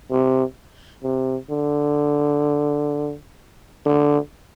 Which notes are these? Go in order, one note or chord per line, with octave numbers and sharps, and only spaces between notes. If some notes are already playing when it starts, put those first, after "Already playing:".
C3
C3
D3
D3